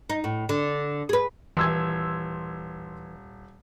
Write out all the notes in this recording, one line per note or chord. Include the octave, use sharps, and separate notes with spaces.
D#4
A2
D3
G#4 B4
D#1 E3 C6 E6 G#6